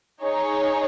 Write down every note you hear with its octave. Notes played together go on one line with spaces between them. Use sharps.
D#4 G#4 C#5